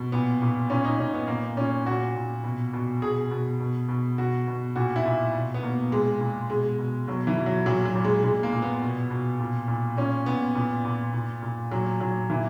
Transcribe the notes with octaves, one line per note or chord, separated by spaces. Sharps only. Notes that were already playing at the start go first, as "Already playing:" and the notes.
Already playing: B2
A#2 B3
A#2
A#2 C#4
D#4
A#2 C#4
B3
A#2 A#3
A#2 C#4
A#2 F#4
A#2
B2
B2
B2 G#4
B2
B2
B2
B2 F#4
B2
A#2 F#4
E4
A#2
B2
B3
B2 A#3
A#2 G#3
A#2
B2 G#3
B2
B2 F#3
E3
B2
F#3
A#2 F#3
F#3
A#2
G#3
A#2 G#3
A#3
A#2
B3
B2
B2
A#2
A#2
A#2 C#4
A#2 B3
A#2
A#2
A#2
A#2
A#2 F#3
A#2 F#3
A#2 E3